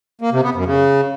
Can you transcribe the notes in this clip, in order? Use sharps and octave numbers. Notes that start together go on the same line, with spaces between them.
A#3
C3
B3
F#2
C#3